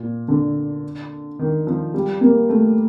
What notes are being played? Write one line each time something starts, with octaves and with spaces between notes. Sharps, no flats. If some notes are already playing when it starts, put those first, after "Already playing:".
Already playing: A#2
D3
D#3
F3
G3
A#3
A3